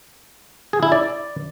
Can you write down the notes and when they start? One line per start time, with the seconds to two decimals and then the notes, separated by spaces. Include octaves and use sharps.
0.73 G#4
0.83 E4
0.92 D5